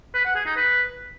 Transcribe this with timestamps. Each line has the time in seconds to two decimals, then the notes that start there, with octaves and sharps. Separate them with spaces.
0.14 B4
0.25 F#5
0.35 G#4
0.46 D#4
0.56 B4